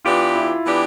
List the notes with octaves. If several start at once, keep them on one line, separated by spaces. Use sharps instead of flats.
E3 B3 D4 F4 G4
E4
E3 B3 D4 G4